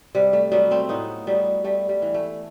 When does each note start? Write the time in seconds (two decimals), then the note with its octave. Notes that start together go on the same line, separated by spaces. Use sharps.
0.15 C3 G3
0.33 A3
0.52 F#3 G3 B3
0.71 A3 C4
0.89 A2 B3 D#4
1.27 F#3 G3 B3
1.64 G3 A3
1.89 G3
2.02 E3
2.14 A3